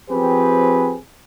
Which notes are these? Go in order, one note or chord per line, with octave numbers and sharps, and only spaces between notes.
F3 C4 G4 G#4 B4